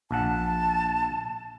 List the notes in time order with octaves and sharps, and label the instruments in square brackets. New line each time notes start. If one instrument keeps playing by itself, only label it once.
[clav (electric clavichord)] A#1 F#5 [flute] A5